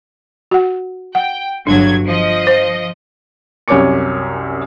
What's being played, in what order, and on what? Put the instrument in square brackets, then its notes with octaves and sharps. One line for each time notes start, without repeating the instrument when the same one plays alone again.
[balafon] F#4 F#5
[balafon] F#5 [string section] G5
[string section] G1 F#3 G#6 [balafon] D4
[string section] F3 D#5
[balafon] C5
[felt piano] C2 F#2 C#5 G#5 D6 C#7